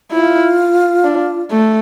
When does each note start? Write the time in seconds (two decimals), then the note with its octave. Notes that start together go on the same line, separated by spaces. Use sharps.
0.12 E4 F4
1.04 D4
1.51 A3